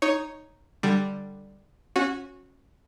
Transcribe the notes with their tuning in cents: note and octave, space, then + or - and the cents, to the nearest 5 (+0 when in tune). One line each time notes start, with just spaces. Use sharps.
D#4 +0 C#5 +0
D3 +10 G3 +0
C#4 -10 F#4 -20